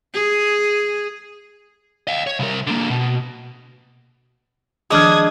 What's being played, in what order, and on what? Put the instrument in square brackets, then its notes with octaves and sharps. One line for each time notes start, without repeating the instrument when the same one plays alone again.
[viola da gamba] G#4
[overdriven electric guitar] D#5 F5
C#5
C2 A#4
D3 A#3
B2
[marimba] D#3 F3 [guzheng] G#3 D4 [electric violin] D#6 G#6